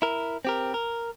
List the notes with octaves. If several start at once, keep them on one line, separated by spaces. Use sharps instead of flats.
E4 A#4
C4 G4 A#4
A#4